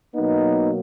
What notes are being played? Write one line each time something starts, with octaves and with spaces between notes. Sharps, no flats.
B2 F#3 A#3 B3 D#4